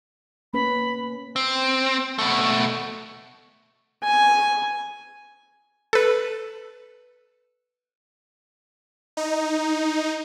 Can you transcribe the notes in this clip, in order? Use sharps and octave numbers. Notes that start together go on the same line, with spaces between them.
A#3 C#4 B4 B5
C4
B2 A3
G#5
A4 B4
D#4